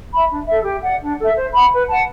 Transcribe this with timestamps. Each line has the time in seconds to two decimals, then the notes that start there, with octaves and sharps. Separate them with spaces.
0.12 E5 B5
0.30 D4
0.46 A4 E5
0.64 G4
0.82 D5 F#5
1.00 D4
1.18 A4 E5
1.35 C5
1.53 F#5 B5
1.72 B4
1.89 F#5 A5